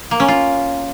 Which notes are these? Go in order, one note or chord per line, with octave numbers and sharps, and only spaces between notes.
A#3
C#4
F4